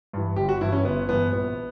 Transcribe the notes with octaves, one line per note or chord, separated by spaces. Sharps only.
G2 E3
G1 G4
F#4
G2 E3 E4
C#4
G1 B3
G2 E3 B3
A#1 B3